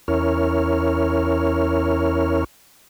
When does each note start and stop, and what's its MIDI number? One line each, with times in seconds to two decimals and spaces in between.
0.08 2.44 40
0.08 2.44 61
0.08 2.44 64
0.08 2.44 70
0.08 2.44 73
0.08 2.44 89